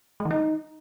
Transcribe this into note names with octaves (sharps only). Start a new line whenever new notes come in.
G#3
D#3
D#4